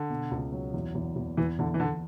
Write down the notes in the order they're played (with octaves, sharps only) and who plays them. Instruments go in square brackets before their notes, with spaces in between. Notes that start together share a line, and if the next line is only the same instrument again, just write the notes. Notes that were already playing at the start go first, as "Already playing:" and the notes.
Already playing: [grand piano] D3
[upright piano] B2
C#2
F#3
E2
E2
E2
[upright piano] E2 [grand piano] E3
[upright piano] E2 [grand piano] D3
[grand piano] E3
[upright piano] E2 [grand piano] D3